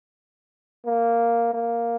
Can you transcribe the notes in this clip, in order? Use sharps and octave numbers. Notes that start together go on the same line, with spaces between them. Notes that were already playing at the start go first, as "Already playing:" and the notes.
A#3
A#3